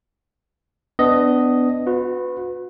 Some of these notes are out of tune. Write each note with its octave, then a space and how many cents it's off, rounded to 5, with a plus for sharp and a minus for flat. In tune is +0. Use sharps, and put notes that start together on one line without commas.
B3 +25 D4 +0 D#5 +0
F#4 -35 B4 +15